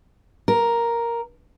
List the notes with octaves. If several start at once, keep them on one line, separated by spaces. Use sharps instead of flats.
A#4